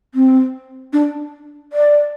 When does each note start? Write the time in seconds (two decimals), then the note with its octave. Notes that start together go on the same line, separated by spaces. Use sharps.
0.14 C4
0.93 D4
1.73 D5